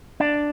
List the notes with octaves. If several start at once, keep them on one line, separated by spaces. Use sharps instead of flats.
D4